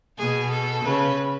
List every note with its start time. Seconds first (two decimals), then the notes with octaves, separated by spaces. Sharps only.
0.18 B2 G#4
0.52 A4
0.84 C#3 B4